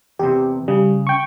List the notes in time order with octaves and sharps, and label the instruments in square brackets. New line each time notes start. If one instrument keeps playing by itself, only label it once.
[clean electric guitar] E2 C3 [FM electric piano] G4
[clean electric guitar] C#3 [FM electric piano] G3
[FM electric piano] G5 C#6